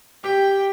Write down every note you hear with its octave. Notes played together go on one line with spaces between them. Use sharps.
G4 G5